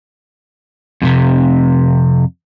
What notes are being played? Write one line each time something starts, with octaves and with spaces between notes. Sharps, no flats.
F2 A2 C3